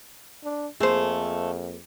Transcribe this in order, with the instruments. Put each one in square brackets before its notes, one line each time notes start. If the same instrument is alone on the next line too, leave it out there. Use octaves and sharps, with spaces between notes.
[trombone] D4
[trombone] F2 [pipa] A3 C5 [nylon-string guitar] A#3 G#4